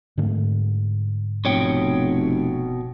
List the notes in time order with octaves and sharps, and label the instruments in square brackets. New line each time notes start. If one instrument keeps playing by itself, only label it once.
[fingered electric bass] G#2 D3 A3
[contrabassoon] F1 [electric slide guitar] B2 C#5 G5